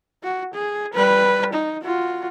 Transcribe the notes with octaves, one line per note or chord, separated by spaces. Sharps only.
F#4
G#4
G3 B4
D#4
F4 F#4